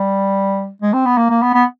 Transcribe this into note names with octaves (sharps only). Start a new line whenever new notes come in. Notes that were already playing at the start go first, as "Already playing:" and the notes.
Already playing: G3
G#3
C4
B3
A#3
A#3
B3
B3